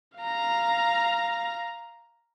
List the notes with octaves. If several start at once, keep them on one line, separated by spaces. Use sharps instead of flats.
F5 A#5